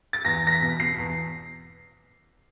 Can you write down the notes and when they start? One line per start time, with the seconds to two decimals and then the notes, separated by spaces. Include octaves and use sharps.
0.13 A6
0.25 E2 A#6
0.43 E2 A#6
0.52 B6
0.62 B2
0.80 B2 C7
0.98 E2